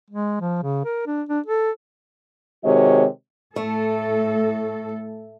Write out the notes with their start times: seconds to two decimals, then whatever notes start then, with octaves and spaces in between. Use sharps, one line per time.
0.10 G#3
0.41 F3
0.63 C#3
0.85 A#4
1.07 D4
1.29 D4
1.47 A4
2.65 C3 D#3 G#3 F#4 C#5 D#5
3.56 A2 A3 A4